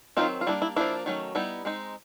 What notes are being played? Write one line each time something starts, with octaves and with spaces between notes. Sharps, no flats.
D#3 F#3 A3 C4 D#4 F4
F4
G3 A#3 D4 E4
E4
F3 A#3 D4 E4
D#3 F#3 A3 C#4
G3 B3 D#4 E4
G#3 C4 D#4